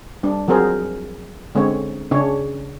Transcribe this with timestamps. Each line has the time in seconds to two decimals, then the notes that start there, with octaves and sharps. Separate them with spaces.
0.23 G3 D4
0.48 F3 F#3 C4 G#4 A#4 C5
1.55 D3 G#3 C4 C#4 C#5
2.11 C#3 C#4 D4 C#5